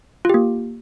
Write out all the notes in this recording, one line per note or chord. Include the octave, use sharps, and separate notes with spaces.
A#3 F4 G4